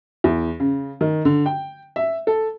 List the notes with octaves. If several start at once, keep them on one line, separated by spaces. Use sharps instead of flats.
E2
C#3
D#3
D3
G5
E5
A4